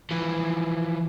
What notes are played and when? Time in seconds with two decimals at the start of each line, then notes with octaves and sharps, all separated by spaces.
0.11 E3 F3